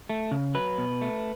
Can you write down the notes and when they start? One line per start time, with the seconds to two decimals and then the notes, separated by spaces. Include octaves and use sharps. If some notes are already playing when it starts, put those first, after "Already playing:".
0.10 A3
0.31 C#3
0.55 F#3 B4
0.78 B2
1.01 A3